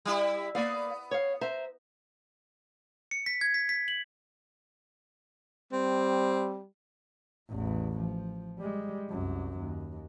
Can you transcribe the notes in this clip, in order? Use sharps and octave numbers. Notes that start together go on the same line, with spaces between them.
G3 E4
A#3 B3 D5 F5
C#5 F5
C5 E5 A#5
C#7
B6
G#6
B6
B6
F#7
G3 C4
A1 E2
F3
G3 G#3
C2 F#2
D#2